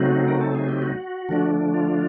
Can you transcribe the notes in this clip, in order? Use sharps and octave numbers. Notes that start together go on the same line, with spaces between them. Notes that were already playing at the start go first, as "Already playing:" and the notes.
Already playing: C#3 F#3 A3 C4 D#4 F#4
A#4
A4
G#4
G4
F#4
D3 F3 A3 D4
F4